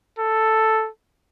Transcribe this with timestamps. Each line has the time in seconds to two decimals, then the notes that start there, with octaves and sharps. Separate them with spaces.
0.19 A4